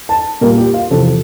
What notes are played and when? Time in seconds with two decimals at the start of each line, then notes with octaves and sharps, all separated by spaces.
0.09 A5
0.41 A#2 G3 A#3 A#4
0.58 G4
0.74 F4
0.90 E2 C3 F3 A4